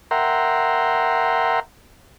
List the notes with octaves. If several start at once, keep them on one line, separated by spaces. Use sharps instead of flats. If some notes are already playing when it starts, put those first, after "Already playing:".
A#4 E5 F#5 G5 A#5 C6